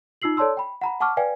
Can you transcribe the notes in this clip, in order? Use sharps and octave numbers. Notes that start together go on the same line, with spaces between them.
D#4 F4 E6 C7 F#7
A4 C#5 D5 A5 C6 E6
G5 B5
F#5 A#5 B5
F#5 A5 C#6 D6 F6
B4 D5 F5 G5 G#5